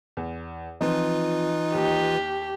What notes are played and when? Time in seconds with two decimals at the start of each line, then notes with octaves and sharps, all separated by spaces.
0.17 E2
0.81 E3 F3 C4 D#4 F4 B4
1.75 D#2 G4